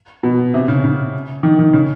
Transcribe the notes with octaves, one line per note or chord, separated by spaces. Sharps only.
B2
C3
C#3
C#3
D#3
D#3
C#3